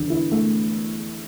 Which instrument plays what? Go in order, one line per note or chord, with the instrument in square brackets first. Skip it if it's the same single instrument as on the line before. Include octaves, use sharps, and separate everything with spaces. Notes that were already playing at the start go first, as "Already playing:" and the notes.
Already playing: [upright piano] E2 D3
E4
A3